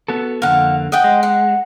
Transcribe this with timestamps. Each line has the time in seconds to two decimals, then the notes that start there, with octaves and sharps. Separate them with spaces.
0.08 B3 F#4 A4
0.42 F2 D3 A#3 F5 F#5
0.92 D#5 F#5 G5
1.04 G#3
1.23 F#5